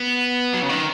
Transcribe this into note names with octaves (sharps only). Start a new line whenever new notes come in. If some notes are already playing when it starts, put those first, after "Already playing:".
Already playing: B3
F#3
C#3
D#3